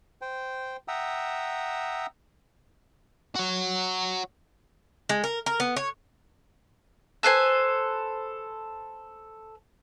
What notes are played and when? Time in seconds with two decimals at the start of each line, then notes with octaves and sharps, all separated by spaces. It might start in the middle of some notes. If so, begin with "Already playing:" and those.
0.22 C5 G5
0.88 E5 F#5 G5 A#5 D#6 E6
3.36 F#4 C#5
5.09 G#3
5.24 A#4
5.46 A#4
5.60 B3
5.76 C#5
7.23 A4 B4 C5 G#5